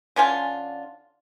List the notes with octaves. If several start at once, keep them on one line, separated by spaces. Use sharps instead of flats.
D3 C#4 F4 G#5